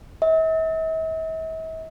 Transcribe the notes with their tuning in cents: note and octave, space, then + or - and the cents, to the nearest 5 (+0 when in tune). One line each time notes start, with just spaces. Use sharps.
E5 -45